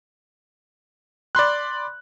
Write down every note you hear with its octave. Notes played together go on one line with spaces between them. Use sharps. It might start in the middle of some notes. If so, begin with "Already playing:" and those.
D5 B5 C6 F#6